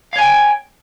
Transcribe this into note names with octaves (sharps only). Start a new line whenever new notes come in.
C#5 F5 G5 G#5